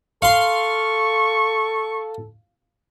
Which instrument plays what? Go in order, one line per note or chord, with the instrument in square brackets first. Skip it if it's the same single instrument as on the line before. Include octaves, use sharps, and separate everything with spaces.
[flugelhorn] A4 [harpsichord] F5 C6 [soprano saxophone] C#6